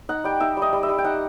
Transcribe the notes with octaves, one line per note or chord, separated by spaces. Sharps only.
D#4 F#5
G3 G5
D#4 E5
G3 D#5
G3
E5
G3
G5
D#4 F#5